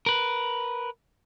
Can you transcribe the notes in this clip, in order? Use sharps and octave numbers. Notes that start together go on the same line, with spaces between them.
A#4 B4